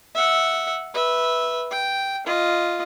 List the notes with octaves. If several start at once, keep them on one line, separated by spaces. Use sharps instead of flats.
E5 F#5
B4 E5
G5
F4 D#5